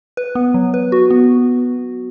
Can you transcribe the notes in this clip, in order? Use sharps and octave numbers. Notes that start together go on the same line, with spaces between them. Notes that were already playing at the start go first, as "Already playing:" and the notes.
B4
B3
F#3
B4
F#4
B3